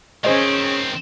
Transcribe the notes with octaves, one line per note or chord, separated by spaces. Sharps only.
D#3 C4 C#4 G#4 C5 D#5